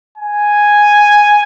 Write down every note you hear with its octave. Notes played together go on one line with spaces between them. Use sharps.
G#5